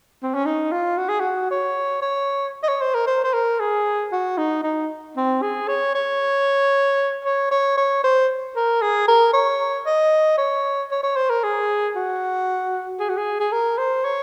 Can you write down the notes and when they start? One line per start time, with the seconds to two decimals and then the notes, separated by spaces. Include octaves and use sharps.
0.23 C4
0.34 C#4
0.46 D#4
0.72 F4
0.98 F#4
1.09 G#4
1.20 F#4
1.51 C#5
2.02 C#5
2.63 D#5
2.68 C#5
2.81 C5
2.95 A#4
3.07 C5
3.24 C5
3.33 A#4
3.60 G#4
4.12 F#4
4.38 D#4
4.64 D#4
5.17 C4
5.42 G#4
5.68 C#5
5.95 C#5
7.25 C#5
7.51 C#5
7.78 C#5
8.04 C5
8.56 A#4
8.82 G#4
9.08 A#4
9.33 C#5
9.86 D#5
10.38 C#5
10.91 C#5
11.03 C#5
11.16 C5
11.30 A#4
11.44 G#4
11.96 F#4
12.99 G#4
13.09 F#4
13.17 G#4
13.40 G#4
13.53 A#4
13.78 C5
14.05 C#5